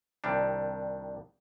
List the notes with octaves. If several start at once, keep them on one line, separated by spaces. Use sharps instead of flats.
C2 D#3 G3 D4